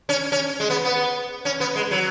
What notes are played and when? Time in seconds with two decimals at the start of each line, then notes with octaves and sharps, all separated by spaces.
0.09 C#4
0.32 C#4
0.60 G#3
0.70 B3
0.85 B3
1.45 C#4
1.60 B3
1.75 G#3
1.91 F#3